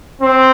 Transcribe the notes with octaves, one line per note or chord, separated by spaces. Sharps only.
C4